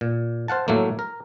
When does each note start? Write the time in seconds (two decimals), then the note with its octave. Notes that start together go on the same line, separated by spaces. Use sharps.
0.01 A#2
0.48 C5 F5 F#5 A5
0.68 A2 F#3 A3 A#3
0.99 A#4